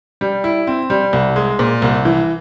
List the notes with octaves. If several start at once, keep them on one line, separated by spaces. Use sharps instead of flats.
G3
E4
C4
G3
C2
G#3
A#2
C2
E3